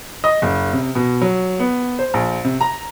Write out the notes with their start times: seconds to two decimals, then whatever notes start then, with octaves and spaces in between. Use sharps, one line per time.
0.24 D#5
0.42 F#1
0.73 C3
0.95 B2
1.22 F#3
1.59 B3
1.99 C5
2.14 A#1
2.45 C3
2.61 A#5